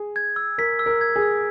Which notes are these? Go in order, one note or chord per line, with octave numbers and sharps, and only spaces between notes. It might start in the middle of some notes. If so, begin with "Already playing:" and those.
Already playing: G#4
G#6
E6
A#4 B6
E6
A#4
G#6
G#4
E6